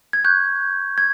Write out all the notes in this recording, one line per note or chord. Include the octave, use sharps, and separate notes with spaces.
G#6
C#6 F#6 G6
G#6